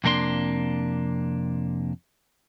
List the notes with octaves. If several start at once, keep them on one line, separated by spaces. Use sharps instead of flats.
F2 C3 A#3 D4 C6